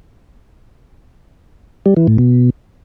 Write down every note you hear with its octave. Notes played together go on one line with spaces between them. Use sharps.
G3
E3
A2
B2